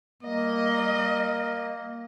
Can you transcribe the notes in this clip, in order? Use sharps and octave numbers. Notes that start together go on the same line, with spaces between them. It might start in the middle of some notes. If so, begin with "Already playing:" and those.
G3 A#3 D#5